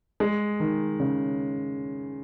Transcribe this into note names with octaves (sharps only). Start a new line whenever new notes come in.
G#3
D#3
C#3